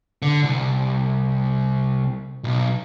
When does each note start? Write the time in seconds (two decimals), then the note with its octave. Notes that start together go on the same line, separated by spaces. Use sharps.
0.22 D3
0.43 C2
2.44 B1